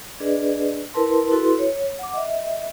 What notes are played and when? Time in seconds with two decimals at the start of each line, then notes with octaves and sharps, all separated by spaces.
0.20 D4 G#4 B4 D5 D#5
0.94 E4 A#4 B4 A5 C6
1.31 E4 F#4 A4 B4 C6
1.59 C#5
1.99 F#5 D6
2.14 D#5 E5